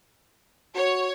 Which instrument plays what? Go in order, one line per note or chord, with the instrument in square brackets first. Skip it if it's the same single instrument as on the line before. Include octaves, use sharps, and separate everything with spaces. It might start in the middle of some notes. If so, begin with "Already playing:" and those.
[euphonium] F#4 [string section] C#5